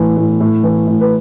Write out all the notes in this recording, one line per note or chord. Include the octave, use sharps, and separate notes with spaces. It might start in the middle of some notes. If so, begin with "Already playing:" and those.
Already playing: A2 E3
A2
A2
E3
A2
B4